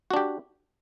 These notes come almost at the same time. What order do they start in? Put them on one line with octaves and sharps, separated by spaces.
F#4 D4 G4